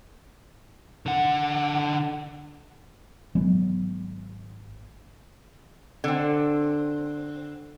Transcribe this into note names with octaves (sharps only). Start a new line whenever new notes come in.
D3 F#5
G#1 F#3 G#3 B3
D3 C4